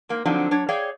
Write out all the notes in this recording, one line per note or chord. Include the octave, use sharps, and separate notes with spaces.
G#2 A#3
D3 F3 F#3 C4 D4 D#4
F#3 D4 C#5
G#4 C#5 D5 F5 G5